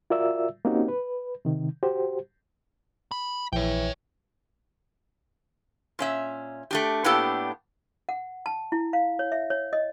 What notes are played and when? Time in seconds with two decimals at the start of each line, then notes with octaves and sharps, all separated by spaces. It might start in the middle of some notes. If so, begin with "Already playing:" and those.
0.10 F4 F#4 A#4 D5 E5 E6
0.65 A#3 C4 C#4 D#4 F#4 G4
0.88 B4
1.45 C3 D#3
1.83 F#4 G4 C5
3.11 B5
3.53 A#1 E3 C#5 G5
5.99 A#2 C#4 E5
6.71 A3 D4 G4
7.04 A2 A#3 B3 D4 G4 A4
8.09 F#5
8.46 A5
8.72 E4
8.93 F5
9.19 C#5
9.32 E5
9.50 C#5
9.73 D#5